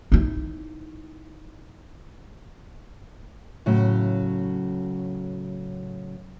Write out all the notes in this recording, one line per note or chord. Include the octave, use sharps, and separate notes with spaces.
D#4 E4
A2 C#3 F#3